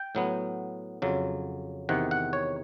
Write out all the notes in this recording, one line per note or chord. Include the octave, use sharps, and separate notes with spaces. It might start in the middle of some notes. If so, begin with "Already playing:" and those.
Already playing: G5
A2 F#3 B3
F2 C#3 F#3
E2 C3 D#3 F#5
F#5
C#5